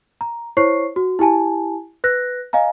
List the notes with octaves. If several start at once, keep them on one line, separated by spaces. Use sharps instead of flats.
A#5
E4 C5 C#5 C#6 C7
F#4
E4 G4 G#5 A5
B4 F#6 A#6
D#5 F5 G#5 A#5